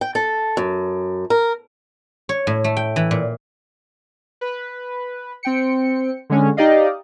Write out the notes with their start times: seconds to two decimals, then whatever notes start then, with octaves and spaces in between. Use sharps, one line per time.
0.01 G5
0.15 A4
0.57 F#2
1.30 A#4
2.29 C#5
2.47 A2
2.64 A3
2.77 G5
2.96 E3
3.11 A#2
4.41 B4
5.43 C4 G5 C#7
6.30 D3 G#3 C#4
6.57 D#4 G4 D5 D#5 F5